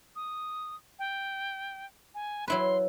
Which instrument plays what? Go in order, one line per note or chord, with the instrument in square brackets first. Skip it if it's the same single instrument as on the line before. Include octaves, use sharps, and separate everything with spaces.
[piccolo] D#6
G5
G#5
[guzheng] F#3 E4 B4 [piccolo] C6